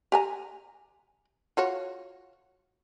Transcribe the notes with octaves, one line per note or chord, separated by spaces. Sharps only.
G4 G#5 A#5
F4 F#4 C#5